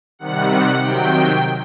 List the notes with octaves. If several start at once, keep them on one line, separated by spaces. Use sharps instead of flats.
C3 D#3 G3 F#5
F#5
C3 D#3 F#3 G5